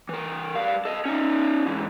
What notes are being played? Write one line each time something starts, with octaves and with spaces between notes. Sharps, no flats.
E3 A#4
G3 F5
A4 D#5
C#4 D#4
G#2 E3